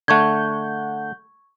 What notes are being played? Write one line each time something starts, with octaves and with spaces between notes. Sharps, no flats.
D3 A3 F#5 C#6 G6 G#6